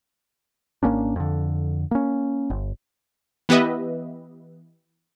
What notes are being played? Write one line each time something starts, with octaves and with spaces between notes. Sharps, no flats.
G#1 A#3 C#4 D4
F2 D3
A#3 C#4
G1
E3 B3 G4 B4 D#5 E5